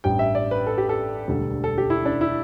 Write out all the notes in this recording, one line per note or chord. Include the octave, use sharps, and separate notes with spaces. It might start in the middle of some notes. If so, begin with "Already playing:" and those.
A1 G2 G3 G5
E5
D5
B4
A4
G4
A4
E1 D2 D3 G3
A4
G4
E4
D4
E4